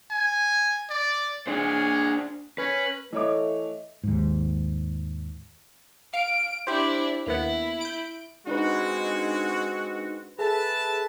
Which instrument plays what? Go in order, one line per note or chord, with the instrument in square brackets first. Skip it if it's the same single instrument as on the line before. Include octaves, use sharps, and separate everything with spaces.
[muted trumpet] G#5
D5
[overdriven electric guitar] D4 C5 [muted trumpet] G#4
[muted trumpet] C#4 [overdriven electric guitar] B4
[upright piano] E3 C#5 D6 [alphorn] A3 [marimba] D#5 E5
[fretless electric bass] D#2 G#2
[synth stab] F5 [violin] D7
[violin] D4 E4 [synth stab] G4 C5
[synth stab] D#2 A#3 B3 [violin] E4
[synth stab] G6 D7
[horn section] G#3 C4 F#4 [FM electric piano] D4 D#4 B4
[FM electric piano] G#4 A4 [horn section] B4 E5 A5